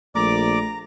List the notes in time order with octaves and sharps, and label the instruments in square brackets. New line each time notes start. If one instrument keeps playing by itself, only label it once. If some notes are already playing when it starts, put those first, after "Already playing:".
[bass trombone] A#1 [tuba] A3 [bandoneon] D5 D6 [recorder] A#5